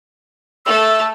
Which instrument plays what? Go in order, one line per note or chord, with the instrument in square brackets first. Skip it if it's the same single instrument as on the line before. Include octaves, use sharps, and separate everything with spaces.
[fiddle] A3 A4 [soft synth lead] E5 [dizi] E6